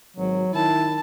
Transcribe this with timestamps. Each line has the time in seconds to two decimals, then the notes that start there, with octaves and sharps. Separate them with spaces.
0.17 G#1 F#3
0.54 D#3 E4 A5